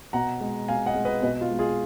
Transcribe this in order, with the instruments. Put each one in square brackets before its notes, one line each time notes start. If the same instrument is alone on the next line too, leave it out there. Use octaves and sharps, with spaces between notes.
[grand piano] B2 F#5 A#5
G#3
B2 F5 G#5
D#5 F#5
G#3
B4 D#5
B2 B4 D#5
F4
G#3
F4 G#4